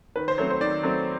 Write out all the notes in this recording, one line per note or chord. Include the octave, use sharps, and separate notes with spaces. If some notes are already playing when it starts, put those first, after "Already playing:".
D#3 B4
C5
F#3 A3 C4 C#5
C5
D#3 D5
F#3 A3 C4